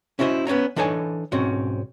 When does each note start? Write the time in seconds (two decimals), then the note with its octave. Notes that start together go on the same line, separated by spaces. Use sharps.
0.19 C#4 E4 F#4 A4 C5 D#5
0.47 B3 C#4 C#5 A#5
0.76 E3 D4 D#4 A4 C#5 G#5
1.32 B1 G#2 C4 C#4 F#4